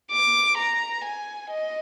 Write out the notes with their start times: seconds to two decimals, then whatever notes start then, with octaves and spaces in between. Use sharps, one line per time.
0.12 D6
0.58 A#5
1.05 G#5
1.50 D#5